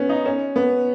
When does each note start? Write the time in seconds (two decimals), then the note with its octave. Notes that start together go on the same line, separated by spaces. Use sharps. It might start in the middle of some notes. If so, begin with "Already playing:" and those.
Already playing: B3 C#4
0.09 D#4
0.25 C#4
0.56 B3